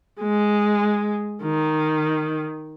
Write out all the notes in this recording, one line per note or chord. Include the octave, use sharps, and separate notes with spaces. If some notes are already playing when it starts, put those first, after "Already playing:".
G#3
D#3